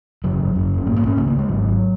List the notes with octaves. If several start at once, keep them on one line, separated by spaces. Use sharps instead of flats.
G#1 F#2 C#3 F#3
F#1 F#2 C#3
C#4
A#1 G#2 A#3
A#3
C#4
C#2 C#3 A#3
A#3
G#3
G#1 G#2 F#3